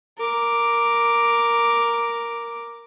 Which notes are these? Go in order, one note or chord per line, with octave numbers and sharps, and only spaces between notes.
A#4 D6